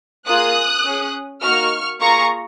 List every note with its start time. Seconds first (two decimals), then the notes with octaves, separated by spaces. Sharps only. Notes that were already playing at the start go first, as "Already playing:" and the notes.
0.27 A#3 F4 G#4 D#6 F#6
0.85 C#4 G#4
1.43 A#3 D#4 F#4 C#6 F6
2.00 A#3 F4 G#4 A#5 C#6